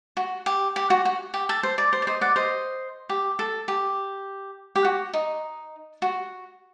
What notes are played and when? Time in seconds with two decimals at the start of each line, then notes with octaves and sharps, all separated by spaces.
0.17 F#4
0.46 G4
0.76 G4
0.90 F#4
1.05 F#4
1.34 G4
1.49 A4
1.63 C5
1.78 D5
1.93 C5
2.02 D5
2.07 C5 D#5
2.21 D5 F#5
2.36 C5 D#5
3.09 G4
3.39 A4
3.68 G4
4.76 G4
4.85 F#4
5.14 D#4
6.02 F#4